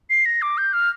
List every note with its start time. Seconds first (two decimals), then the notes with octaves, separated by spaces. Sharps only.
0.10 C7
0.25 A#6
0.42 D6
0.58 G6
0.73 F6